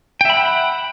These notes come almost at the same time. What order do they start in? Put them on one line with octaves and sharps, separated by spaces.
G5 E5 B5 F#5